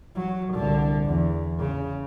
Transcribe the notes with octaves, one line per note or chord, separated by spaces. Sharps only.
F#3
C2 D3
E2
C#3